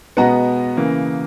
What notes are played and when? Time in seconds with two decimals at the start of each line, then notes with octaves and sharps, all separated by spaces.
0.17 B2 G#3 B3 F#5 A#5
0.77 C#3 E3 A#3